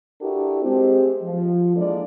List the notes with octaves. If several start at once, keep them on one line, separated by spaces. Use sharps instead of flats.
D4 E4 F#4 G4 A4 A#4
G#3 C4 G4
F3
E3 G#3 A#3 D4 A4 D5